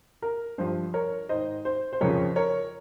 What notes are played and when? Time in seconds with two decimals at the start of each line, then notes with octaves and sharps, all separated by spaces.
0.22 A#4
0.58 G2 F3 C5
0.94 A#4 C#5
1.29 G#2 D#3 C5 D#5
1.65 C5
1.93 C5
2.01 F2 C#3 F3 A#4 C#5
2.36 A#4 C#5